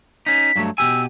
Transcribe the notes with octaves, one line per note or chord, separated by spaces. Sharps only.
C#4 D#4 B6
G2 F#3 A3
B2 G4 G#5 E6